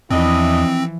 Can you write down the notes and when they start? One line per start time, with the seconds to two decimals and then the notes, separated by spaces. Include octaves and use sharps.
0.10 E2 E3 F3 C4 D4 E4 D#5